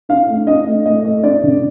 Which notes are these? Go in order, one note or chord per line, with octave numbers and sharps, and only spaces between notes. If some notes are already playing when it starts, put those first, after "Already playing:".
D4 F5
A3
D4 D#5
A3
A3 D#5
A3
D4 D5
D3